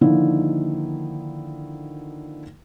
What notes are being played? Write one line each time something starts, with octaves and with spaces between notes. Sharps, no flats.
D3 D#3 F3 A#3 D#4 E4